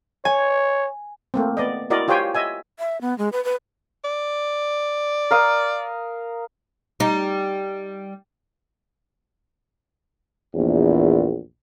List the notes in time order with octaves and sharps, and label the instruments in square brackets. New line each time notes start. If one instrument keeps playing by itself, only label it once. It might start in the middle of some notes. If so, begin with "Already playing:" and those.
[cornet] C#5 [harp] G#5
[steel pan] A3 A#3 C4
B3 D5 D#5
E4 F#4 A#4 D5 D#5
F4 G4 C5 C#5 G5 G#5
D#5 E5 G#5
[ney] E5
B3
G#3
B4
B4
[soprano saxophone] D5
[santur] A#4 F5 D#6
[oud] G3 D#4
[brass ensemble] A#1 E2